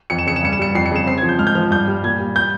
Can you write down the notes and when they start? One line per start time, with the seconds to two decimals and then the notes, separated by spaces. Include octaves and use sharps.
0.10 F2 C#7
0.19 E7
0.26 C#3 C#7
0.36 E7
0.43 G2 C#7
0.53 E7
0.59 G3 C#7
0.75 F2 C7
0.86 C#7
0.91 C#3 E7
1.07 C4 C7
1.18 G#6
1.23 F3
1.29 G6
1.39 G#2 F6
1.47 G6
1.55 F3 F6
1.71 G2 G6
1.88 G3
2.03 A#2 G#6
2.20 G3
2.36 G6